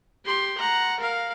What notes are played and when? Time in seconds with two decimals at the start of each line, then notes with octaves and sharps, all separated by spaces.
0.25 G4 C6
0.58 F#5 A#5
1.00 A#4 F5